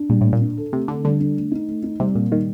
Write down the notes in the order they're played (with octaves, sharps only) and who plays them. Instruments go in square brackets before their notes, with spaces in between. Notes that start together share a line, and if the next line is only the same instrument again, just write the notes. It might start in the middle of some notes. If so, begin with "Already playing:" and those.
Already playing: [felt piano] D4
[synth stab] A#2 [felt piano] G3
[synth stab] A2 [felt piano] A#3
[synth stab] A#2
[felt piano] D4
A4
[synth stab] C3 [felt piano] A3
[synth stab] D3 [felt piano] D4
[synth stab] D3 [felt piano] G3
[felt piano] D4
A3
D#4
A3
D#4
[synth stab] C3 [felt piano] G3
[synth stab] A#2 [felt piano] A#3
[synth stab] D#3 [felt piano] G3